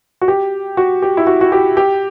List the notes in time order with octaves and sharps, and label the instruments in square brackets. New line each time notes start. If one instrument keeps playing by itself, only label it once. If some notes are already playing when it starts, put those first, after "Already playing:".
[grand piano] F#4
G4
F#4
G4
E4
F#4
F#4
G4
G4